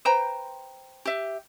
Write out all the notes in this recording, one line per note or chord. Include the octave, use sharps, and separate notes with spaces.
B4 C5 G5 A#5
G4 E5